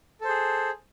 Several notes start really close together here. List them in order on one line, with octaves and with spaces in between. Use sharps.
A4 C5 G#4